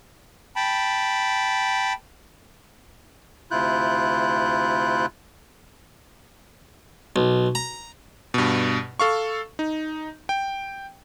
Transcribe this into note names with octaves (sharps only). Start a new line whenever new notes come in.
G5 A5 B5
D2 C3 E4 F4 F#6 G6
B1
A#5
G2 B2
A4 F5 C#6
D#4
G5